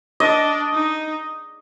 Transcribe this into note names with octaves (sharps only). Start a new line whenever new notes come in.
D4 D#5
D#4